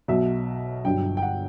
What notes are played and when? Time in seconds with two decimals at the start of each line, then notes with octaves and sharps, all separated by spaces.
0.08 B1 B2 F#3 E5
0.84 G1 G2 D3 F#3 G5
1.17 G5
1.22 F#5